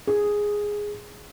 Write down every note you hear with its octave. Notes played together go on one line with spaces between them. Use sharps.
G#4